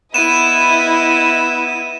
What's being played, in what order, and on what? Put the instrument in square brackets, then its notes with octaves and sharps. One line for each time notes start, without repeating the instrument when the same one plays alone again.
[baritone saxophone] B3 [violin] E4 D#5 [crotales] D#7 E7